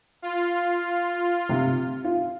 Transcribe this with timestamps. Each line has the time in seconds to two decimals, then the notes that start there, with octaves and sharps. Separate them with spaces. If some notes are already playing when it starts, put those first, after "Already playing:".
0.22 F4
1.49 C3
2.04 F4